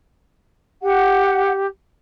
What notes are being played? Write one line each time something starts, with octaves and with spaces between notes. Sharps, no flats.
G4 F#5